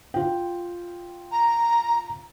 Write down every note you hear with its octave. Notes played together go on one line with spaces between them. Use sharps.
F4 G5
A#5